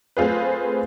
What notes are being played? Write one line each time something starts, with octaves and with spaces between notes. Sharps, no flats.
A3 C4 F4 G#4 B4